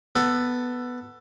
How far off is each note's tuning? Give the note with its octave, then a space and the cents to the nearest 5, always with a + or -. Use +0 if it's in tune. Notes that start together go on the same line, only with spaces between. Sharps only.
B3 +0 A4 +15